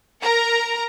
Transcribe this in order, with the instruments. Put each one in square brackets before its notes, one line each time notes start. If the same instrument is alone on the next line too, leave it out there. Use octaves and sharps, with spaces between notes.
[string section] A#4 A#5